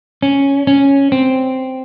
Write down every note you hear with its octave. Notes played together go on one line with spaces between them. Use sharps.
C#4
C#4
C4